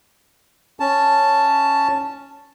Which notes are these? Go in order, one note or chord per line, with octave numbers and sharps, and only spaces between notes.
C#4 A5